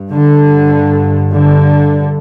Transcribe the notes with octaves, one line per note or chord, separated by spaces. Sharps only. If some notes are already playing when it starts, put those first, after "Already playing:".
Already playing: G2
D3
D3